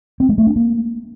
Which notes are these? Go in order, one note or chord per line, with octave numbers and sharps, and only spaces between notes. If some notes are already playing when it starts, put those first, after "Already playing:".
C4
G#3
A3
D4
A#3